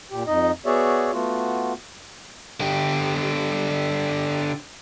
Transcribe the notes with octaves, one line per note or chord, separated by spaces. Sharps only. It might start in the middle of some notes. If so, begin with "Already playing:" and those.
A#2 G4
F2 D#4 D#5
B3 F#4 G#4 C#5 D5 E5
A3 B3 F4 F#4
D3 G4